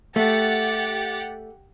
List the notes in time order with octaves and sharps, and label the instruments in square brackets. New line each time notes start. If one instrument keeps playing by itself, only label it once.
[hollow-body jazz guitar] A3 [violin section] G4 F#5 A6